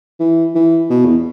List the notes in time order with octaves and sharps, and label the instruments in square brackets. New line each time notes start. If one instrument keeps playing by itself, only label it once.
[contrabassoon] E3
E3
B2
E2